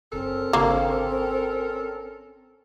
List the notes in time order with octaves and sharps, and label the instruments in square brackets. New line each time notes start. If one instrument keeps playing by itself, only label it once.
[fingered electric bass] F#1 [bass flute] C4 [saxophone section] C#4 A4 A#4
[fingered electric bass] G#1 C#3 D4 [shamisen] A#3